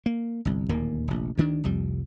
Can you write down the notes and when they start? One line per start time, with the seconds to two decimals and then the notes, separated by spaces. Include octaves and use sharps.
0.06 A#3
0.45 G1 C2
0.69 D1 D#2 A#2 A#3
1.08 F1 A#1
1.37 D2 D#3 D4
1.64 F1 C2 F2 G3